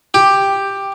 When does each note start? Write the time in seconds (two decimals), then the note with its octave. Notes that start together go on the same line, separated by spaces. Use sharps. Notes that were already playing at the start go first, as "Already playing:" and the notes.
0.14 G4